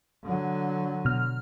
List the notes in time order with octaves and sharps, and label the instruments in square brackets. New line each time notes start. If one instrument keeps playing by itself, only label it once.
[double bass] D3 F#3
[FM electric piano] B2 F6